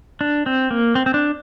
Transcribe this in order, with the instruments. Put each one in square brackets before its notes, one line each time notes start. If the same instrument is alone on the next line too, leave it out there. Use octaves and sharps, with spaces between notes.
[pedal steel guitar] D4
C4
A#3
C4
C4
D4